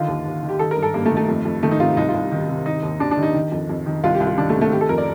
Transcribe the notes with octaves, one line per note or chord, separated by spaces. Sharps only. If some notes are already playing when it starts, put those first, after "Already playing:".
Already playing: D3 D#3 F4
D#2
D#2
D#3
G4
D#3 A4
A#4
G2
A4
G2 A#3
A3
D#3
A3
F2
F2
D#3 A3
D#4
C3 F4
C2 D#4
F4
C2
D#3
C3
D#3 D#4
D#2
D#2 D4
D4
D#3
D#4
D#3
F2
F2
D#3
C2 F4
G4
C2
F4
D#3 D4
A3
C3
A3
D#3 G4
A4
F2 A#4
D5